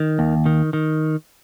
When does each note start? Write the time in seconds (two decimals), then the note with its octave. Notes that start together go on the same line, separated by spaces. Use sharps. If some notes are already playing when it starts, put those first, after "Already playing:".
Already playing: D#3
0.19 D#2
0.46 D#3
0.73 D#3